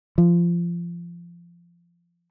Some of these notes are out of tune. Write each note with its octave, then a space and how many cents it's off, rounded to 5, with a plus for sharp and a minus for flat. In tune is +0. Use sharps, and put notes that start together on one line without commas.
F3 -20